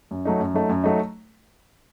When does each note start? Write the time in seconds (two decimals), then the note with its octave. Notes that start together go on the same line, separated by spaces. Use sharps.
0.11 F#2
0.25 F#3 A3 D#4
0.40 F#2
0.54 F#3 A3 D#4
0.69 F#2
0.84 F#3 A3 D#4